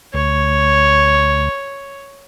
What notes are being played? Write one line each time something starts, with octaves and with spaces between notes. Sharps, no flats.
D2 C#5